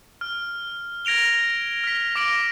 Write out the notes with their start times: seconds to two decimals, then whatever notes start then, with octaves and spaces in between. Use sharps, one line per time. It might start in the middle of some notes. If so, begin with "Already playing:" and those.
0.21 F6
1.05 G#6 A#6 D7 F7 G7
1.84 F6 B6
2.15 D6 A#6 D7 F#7